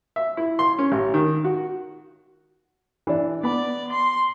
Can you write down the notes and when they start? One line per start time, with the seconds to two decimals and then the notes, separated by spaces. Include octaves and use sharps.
0.16 E5
0.37 E4
0.59 C6
0.79 C#4
0.92 A1
1.14 D#3
1.45 F#4
3.07 E3 D4
3.43 B3 D5 B5
3.92 C6